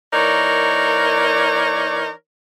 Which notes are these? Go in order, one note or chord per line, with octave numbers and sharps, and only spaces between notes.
E3 A#3 D#4 A#4 C#5 D5